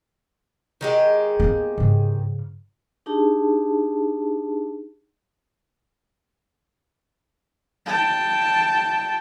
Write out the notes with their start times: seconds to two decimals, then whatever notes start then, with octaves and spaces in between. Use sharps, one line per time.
0.81 D#3 G#3 G4
1.40 A#3 B3
1.78 G#2 C#3
3.06 D4 D#4 G4 G#4 A5
7.86 G5 A5